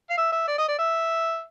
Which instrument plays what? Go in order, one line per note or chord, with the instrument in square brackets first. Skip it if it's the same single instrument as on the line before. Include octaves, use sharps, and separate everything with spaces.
[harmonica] F5
E5
E5
D5
D#5
D5
E5